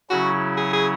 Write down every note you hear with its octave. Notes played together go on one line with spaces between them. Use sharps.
C#3 F#3 C#4 E4 F#4
G#4
G#4